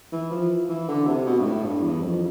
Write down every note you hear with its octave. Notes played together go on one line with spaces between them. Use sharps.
E3
F3
E3
D3
C3
B2
G2
A2
G2
E2
F2